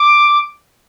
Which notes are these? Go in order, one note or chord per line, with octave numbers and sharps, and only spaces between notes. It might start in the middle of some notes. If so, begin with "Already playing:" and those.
Already playing: D6